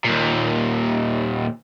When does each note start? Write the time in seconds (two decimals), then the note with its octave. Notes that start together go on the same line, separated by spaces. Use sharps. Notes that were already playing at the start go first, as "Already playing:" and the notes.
0.05 D#2 A#2